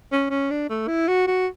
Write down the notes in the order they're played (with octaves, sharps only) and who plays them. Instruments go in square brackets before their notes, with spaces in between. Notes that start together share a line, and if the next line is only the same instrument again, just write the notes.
[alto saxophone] C#4
C#4
D4
A3
E4
F#4
F#4